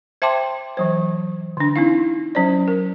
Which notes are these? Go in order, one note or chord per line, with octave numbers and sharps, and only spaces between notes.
C5 E5 G5 A5 C6 D6
E3 F#3 C5
D3 D4
C4 D#4 E4 F5
F#3 C#4 C5 D5
A#4